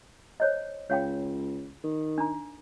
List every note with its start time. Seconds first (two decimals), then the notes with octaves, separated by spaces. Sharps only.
0.40 C5 C#5 D#5
0.90 C#2 C#5 F5 G5
1.84 D#3
2.18 D4 A#5